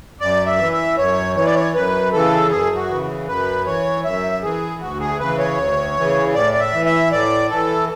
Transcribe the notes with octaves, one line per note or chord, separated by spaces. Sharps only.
F#2 D5
E5
E3
E5
F#2 C#5
E3 C#5
D5
C#5
F#2 B4
C#3 E3 A4
F#2 G#4
F#4
C#3 E3
F#2 B4
E3 C#5
F#2 E5
E3 G#4
D2 F#4
G#4
C#3 E3 B4
C#5
D2
C#3 E3
A2 D5
D5
E5
E3
E5
A2 D5
E3 A4